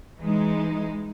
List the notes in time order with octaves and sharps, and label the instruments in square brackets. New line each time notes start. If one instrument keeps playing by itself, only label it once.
[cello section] E3 G#3 D#4